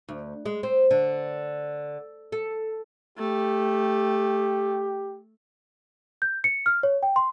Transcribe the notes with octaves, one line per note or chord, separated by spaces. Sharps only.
D2
G#3
C4
D3
A4
A3 G4
G6
C#7
F6
C#5
G5
C6